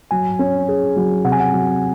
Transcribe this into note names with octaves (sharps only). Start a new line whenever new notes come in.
F#3 G#5
C#4
G#4
F#3
C3 F#5
G#5
F#5
F#3